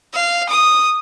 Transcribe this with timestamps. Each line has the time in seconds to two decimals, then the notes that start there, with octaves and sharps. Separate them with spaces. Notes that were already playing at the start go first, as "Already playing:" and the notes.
0.14 F5
0.49 D#6